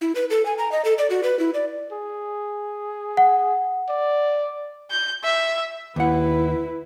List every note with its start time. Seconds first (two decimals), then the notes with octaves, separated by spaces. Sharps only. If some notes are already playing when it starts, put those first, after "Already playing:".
0.01 E4
0.15 B4
0.30 A4
0.46 G#5
0.58 A#5
0.72 D#5
0.85 A4
0.98 D5
1.10 F#4
1.23 B4
1.39 E4
1.54 D5
1.92 G#4
3.17 F#5
3.89 D5
4.90 G6
5.24 E5
5.96 D#2 E4 B4 F#5